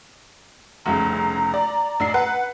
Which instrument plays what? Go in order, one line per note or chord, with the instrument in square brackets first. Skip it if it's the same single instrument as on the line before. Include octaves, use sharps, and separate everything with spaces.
[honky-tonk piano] F1 C2 C#3 [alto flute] A#5
[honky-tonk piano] D5
A1 D4 C7
B4 F#5